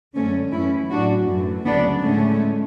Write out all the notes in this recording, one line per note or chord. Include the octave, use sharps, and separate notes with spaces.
F#2 D3 G#3 A3 C#4
F#2 E3 A3 C#4 E4
A2 F#3 A3 D4 F#4
F#2 E3 A3
D2 C#3 F#3 B3 D4
A2 G#3 A3 C#4